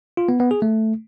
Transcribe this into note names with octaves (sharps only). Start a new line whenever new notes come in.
F4
B3
B3
G#4
A3